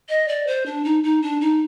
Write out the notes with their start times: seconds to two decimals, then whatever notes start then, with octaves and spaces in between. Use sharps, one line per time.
0.09 D#5
0.28 D5
0.47 C5
0.66 D4
0.85 D#4
1.04 D#4
1.22 D4
1.41 D#4